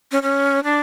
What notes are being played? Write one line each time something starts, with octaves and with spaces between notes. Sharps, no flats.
C#4
C#4
D4